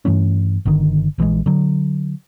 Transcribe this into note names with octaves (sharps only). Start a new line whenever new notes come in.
G2 E3 A3 C#4
G1 D3 D#3
A#1 E3 F3 G#3
D3 F#3